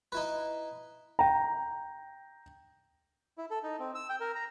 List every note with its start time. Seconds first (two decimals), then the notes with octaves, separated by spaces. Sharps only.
0.12 D#4 E4 B4
1.19 G5 A#5
3.38 E4
3.51 A4
3.63 D#4
3.79 C4
3.95 E6
4.09 G5
4.20 A#4
4.35 A#5